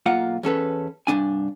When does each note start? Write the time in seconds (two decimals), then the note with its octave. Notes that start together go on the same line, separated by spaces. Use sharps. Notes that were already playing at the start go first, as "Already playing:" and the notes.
0.06 B1 A#3 F4 F#5
0.43 E2 C#4 A4 B4
1.07 C2 G2 A#2 D4 G#5